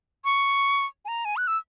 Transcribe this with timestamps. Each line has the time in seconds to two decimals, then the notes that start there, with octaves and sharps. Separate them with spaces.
0.25 C#6
1.05 G#5
1.08 A#5
1.25 G#5
1.37 F#6
1.47 E6